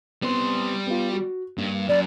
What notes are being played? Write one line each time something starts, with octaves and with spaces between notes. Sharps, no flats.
G3 B3 C4 C6
B3 F4
F#4
G2 A#3
F#2 D5